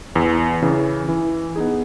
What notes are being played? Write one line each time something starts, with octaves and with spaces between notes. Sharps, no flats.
E2
C#3 E3
E3
B3 D#4 G#4